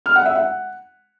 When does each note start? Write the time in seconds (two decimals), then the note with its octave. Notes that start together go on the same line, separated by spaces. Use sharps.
0.06 F6
0.16 F#5
0.26 E5
0.36 F#5